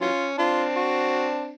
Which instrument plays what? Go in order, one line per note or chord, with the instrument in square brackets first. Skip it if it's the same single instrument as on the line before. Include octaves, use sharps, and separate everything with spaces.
[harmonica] E3 F#3 C#4 [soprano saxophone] F4
[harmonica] C4 D4 [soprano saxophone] F4
[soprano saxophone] F#4